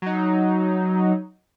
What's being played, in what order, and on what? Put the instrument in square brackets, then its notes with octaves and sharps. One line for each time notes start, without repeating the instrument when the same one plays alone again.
[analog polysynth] F#3 D#4